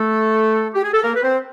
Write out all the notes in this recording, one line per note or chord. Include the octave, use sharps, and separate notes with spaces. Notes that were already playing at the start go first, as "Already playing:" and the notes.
Already playing: A3 A4
G4
G#4
A4
A#3 A#4
B4
C4 C5